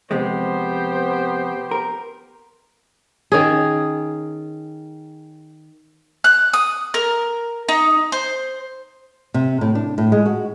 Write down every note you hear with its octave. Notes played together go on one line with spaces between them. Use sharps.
F2 C3 G#3 B3 G4 C5
A#4
D#3 C#4 G#4
F#6
D#6
A#4
D#4
C5
C3
A2
D4
A2
G#3
F#4